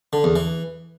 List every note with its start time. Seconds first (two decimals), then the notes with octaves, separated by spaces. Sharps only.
0.13 D3
0.24 E2
0.36 E3